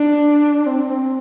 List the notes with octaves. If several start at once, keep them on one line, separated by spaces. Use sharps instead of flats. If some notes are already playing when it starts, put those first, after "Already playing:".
Already playing: D4
C4
C4